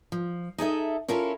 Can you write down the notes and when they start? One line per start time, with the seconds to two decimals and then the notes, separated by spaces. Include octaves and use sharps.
0.12 F3
0.58 D#4 G#4 A4 E5
1.08 C#4 E4 F4 A4 A#4 C#5